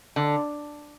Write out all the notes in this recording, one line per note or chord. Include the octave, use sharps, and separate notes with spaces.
D3